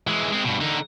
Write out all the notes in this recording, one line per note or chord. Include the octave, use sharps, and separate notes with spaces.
E3 G#3
G#3 C4
G2 B2
D3 D#4